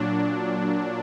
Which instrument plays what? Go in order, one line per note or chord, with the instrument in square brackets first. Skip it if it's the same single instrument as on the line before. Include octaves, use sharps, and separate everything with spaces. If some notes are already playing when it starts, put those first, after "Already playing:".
Already playing: [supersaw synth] A#2 F#3 D4